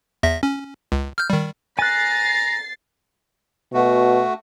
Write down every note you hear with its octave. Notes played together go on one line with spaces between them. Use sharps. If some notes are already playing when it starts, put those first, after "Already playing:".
E2 E5 A#6
C#4
C#2
F6 G6
D#3 G3
G#5 A#5 F#6 A6 C7
B2 A3 F#4